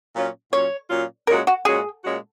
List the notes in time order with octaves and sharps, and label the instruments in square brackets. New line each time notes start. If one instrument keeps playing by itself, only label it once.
[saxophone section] A#2 F#3 C#4 F4
[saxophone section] A#2 F#3 C#4 F4 [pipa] C#5
[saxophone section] A#2 F#3 C#4 F4
[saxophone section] A#2 G#3 C#4 F#4 [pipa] A#4
[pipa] F#4
[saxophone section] A#2 G#3 C#4 F#4 [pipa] G#4
[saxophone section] A#2 G#3 C#4 F#4